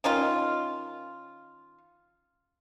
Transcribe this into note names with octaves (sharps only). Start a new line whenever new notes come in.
D#3 C#4 D#4 F4